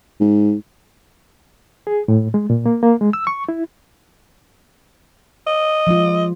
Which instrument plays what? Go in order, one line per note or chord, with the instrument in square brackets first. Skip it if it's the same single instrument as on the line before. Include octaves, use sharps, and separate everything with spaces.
[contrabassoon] G#2
[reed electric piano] G#4
A2
G#3
A#2
A#3
A#3
G#3
E6
C#6
E4
[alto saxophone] D#5
[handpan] F3 G#3 F4